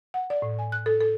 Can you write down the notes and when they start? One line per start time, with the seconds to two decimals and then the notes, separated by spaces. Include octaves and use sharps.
0.14 F#5
0.30 D5
0.42 A2
0.59 G#5
0.72 F#6
0.86 A4
1.01 A4